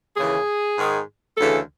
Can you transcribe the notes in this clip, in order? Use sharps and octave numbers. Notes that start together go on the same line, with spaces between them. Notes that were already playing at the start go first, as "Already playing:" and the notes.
D#2 C#3 E3 G#4
G#2 D#3
D2 C#3 E3 A4